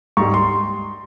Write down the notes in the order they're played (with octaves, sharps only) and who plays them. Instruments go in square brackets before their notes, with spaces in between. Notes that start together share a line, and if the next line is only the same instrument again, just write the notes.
[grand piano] G#2 G3 C#6
C6